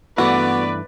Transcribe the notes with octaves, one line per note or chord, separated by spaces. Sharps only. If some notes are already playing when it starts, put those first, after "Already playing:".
G2 E3 A3 B3 F#4 B4 D5